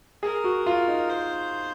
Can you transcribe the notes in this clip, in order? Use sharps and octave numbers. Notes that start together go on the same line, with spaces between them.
G#4 A#4
F#4
F4
D#4
C5